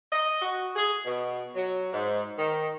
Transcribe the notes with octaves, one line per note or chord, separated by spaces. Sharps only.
D#5
F#4
G#4
B2
F#3
G#2
D#3